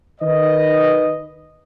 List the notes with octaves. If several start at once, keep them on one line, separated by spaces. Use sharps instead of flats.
D#3 B4 D#5